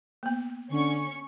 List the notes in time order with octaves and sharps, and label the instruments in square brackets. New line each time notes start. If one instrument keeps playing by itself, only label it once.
[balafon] A#3 B3
[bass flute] D3 [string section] C#4 C#6